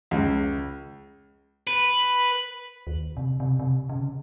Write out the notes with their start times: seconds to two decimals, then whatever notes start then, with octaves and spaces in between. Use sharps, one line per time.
0.11 C#2
1.67 B4
2.87 D#2
3.17 C3
3.40 C3
3.60 C3
3.89 C#3